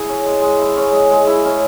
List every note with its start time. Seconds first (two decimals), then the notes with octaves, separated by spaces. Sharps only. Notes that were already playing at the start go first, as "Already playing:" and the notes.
Already playing: E4 G#4
0.08 C#4
0.25 G#3
0.42 G#3
0.59 E4
0.77 C#4
0.93 G#3
1.11 G#3
1.27 E4
1.45 C#4